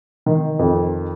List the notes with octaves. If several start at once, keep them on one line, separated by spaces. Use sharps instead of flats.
D#3
F2